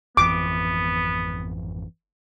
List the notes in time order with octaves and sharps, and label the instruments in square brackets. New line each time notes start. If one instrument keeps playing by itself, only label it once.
[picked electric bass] G#1 F2 E3 [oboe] B3 [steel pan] D6